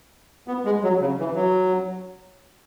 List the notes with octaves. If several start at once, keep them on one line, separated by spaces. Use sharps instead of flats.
B3
G#3
F#3
C#3
E3
F#3